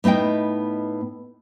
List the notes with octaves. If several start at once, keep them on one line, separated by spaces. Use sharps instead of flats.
A2 B3 D#4 D#5 G5